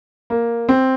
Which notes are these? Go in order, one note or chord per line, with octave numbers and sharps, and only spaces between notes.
A#3
C4